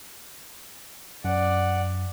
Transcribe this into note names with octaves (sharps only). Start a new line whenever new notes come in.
F#2 D5 F#5